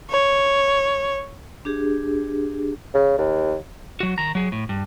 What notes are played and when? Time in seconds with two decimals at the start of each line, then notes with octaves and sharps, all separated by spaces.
0.10 C#5
1.65 D4 G4 G#4
2.94 C#3
3.18 D#2
4.00 F#3 F#4
4.18 D#3 A#5
4.35 F#3 G#4
4.52 A2
4.69 G2